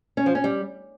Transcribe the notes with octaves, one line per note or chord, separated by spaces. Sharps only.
C#4
F3
C#4
G3